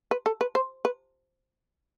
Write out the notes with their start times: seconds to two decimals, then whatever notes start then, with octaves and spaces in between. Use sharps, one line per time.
0.11 B4
0.26 A4
0.41 B4
0.55 C5
0.85 B4